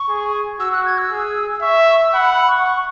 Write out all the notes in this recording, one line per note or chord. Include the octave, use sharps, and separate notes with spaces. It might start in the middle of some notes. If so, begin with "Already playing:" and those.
Already playing: C#6
G#4
F#4 E6
F#6
G#6
E6
G#4
E5 C#6
C#6
E6
F#5 B5
B5
C#6
C#6